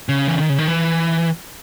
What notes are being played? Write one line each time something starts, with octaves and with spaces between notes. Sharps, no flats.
C#3
E3
D#3
C#3
D#3
E3